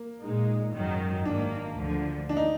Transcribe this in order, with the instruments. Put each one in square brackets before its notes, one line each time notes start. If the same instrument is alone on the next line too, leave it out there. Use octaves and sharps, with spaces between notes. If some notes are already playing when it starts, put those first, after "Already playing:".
Already playing: [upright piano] A#3
[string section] A#2 G#3 D#4
G#1 F#2 D#3 F#3
[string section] G#2 D#3 A#3 [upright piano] D4
[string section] D2 D3 F3
[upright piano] D4
D#4